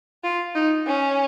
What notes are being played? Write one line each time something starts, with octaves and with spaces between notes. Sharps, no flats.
F4
D#4
C#4